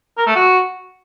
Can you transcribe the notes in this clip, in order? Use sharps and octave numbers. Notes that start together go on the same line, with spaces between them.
A#4
A3
F#4